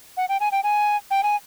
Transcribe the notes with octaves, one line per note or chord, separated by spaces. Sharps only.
F#5
G5
G#5
G5
G#5
G5
G#5